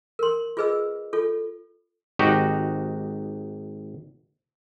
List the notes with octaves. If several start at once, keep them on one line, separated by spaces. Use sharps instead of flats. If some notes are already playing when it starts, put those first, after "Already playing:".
A#4 C6
F4 G#4 B4 D#5 E6
F4 A4
G#1 D#4 F#4 G4